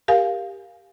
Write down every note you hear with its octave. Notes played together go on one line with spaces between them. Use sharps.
G4 A#4 F5 G#5